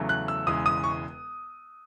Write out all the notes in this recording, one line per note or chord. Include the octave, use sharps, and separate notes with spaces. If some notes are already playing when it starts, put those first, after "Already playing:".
Already playing: E2 C#3 F#3 A3
F#6
E6
E1 E2 C#3 G#3 D#6
D#6
C#6